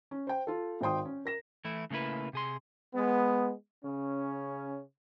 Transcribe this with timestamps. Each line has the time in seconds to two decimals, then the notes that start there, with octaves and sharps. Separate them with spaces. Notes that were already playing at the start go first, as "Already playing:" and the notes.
0.11 C#4
0.27 C5 G5
0.47 F4 A4
0.81 G#1 D#3 C5 G5 C6 D#6
1.05 C#4
1.25 A#4 A#6 E7
1.65 E3 A3 E4
1.90 C#3 A3 A#3 E4 B4
2.33 C3 G#4 C6
2.94 G#3 B3
3.84 C#3 C#4